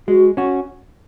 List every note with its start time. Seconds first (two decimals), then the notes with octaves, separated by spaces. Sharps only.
0.08 G#3 F#4
0.37 C#4 F#4